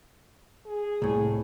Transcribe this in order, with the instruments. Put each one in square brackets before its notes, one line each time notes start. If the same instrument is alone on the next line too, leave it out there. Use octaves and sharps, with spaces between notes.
[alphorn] G#4
[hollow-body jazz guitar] C2 A2